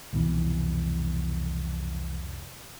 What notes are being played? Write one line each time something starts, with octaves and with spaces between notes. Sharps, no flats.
C2 F2 B2 E3